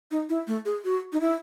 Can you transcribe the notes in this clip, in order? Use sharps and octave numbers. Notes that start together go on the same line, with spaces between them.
D#4
E4
A3
G#4
F#4
D#4
E4